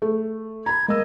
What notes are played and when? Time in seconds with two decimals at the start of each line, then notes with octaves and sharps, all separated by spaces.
0.02 A3
0.66 A#5 B5 G#6
0.88 G#3 A#3 D#5 E6